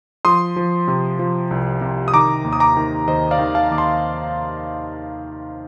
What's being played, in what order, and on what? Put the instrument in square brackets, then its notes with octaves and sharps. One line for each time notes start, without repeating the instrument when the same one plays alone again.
[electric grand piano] F3 C6 D#6
F3
C3
F3
C2
C3
D#6
D#3 A#5 D6
D#2
D#6
A#5 D6
D#3
D#2 C5 D#5
D5 F5
D#3
F5 A5
D#2 D6
A5 C6